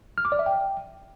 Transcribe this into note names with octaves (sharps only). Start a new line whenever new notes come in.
F6
D6
D5
E5
G5